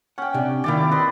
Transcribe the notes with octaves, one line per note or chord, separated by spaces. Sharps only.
C#4 F#5 G5
C3 D4
C3 D#3 A#3 E4 D5
B4 D#5 C6